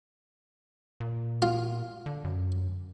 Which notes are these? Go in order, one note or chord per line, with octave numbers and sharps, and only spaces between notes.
A#2
F4
D3
F#2